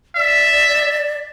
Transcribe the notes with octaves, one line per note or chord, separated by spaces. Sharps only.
D5 E5